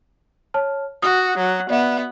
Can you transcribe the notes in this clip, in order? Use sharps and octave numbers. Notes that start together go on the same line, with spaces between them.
C#5 A5 F6
F#4 D#6
F#3
B3 D5 E5